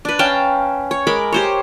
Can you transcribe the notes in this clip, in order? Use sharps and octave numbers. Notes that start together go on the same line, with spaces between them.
D4 B4
C#4 F5 G5 A5
C#5
G#3 A#4 B5 D6
G4 C5 C#5